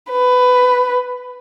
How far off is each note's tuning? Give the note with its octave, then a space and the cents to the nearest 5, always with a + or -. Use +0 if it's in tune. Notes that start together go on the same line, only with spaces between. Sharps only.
B4 +15